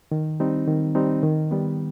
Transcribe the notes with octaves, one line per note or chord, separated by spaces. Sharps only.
D#3
G3 C4 D#4
D#3
G3 C4 D#4
D#3
G3 B3